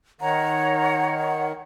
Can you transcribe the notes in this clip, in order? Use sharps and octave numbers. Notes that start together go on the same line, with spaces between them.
D#3 C#5 F#5 A#5